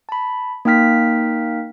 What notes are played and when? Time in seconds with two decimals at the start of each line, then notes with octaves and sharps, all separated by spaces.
0.09 A5 B5
0.65 A#3 D#4 G5 F6 B6